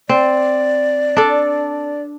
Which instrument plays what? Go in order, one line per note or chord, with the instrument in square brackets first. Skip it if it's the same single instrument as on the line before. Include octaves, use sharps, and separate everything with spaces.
[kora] C4 [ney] D5
[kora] D4 A4